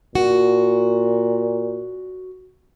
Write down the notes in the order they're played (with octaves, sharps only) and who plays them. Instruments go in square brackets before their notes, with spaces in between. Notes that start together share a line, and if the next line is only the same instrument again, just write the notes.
[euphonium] A#2 [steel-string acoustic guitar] F#4